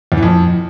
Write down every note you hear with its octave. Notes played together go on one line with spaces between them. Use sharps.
E2
E3
F2